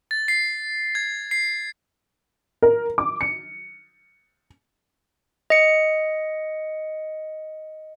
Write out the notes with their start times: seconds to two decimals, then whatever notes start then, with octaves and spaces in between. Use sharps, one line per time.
0.11 A6
0.28 C7
0.95 G#6
1.31 C7
2.62 A#4
2.98 D6
3.21 C#7
5.50 D#5 C#7